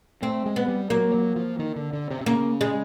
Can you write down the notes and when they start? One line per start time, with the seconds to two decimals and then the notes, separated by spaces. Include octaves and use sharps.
0.22 A3 C4
0.46 G#3
0.56 B3
0.68 G3
0.90 F#3 A#3
1.14 F#3
1.36 F3
1.59 D#3
1.76 D3
1.93 D3
2.11 C3
2.21 C3
2.26 C#3 A#3
2.61 G#3